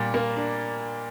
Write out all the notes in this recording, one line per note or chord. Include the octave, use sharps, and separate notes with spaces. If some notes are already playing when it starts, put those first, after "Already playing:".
Already playing: A#2 G3 D6
A#3
D4